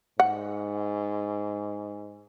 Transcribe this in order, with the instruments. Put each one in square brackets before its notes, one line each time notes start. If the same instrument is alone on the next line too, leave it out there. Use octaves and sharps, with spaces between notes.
[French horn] G#2 [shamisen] F#5